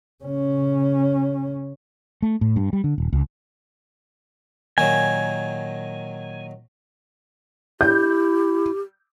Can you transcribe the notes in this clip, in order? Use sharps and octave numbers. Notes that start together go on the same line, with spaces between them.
C#3 C#4
A3
A2
G2
G3
D3
D#1
C#2
A#2 D#3 F#3 G#5
E4 G4 G6